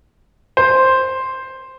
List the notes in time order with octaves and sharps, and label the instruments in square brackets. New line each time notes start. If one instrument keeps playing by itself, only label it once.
[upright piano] C5